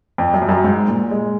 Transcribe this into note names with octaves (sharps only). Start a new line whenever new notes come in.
F2
F#2
F2
F#2
G#2
A#2
G#3